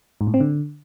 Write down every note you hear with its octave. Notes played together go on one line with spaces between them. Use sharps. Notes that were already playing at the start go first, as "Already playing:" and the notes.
G#2
A2
C4
D3